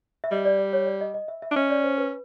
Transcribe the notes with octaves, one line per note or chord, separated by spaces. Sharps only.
E5
G3 D#5
D5
D5
C#5
D5
D#5
D#5
E5
E5
D4
C#4 D#5
D5
C5
B4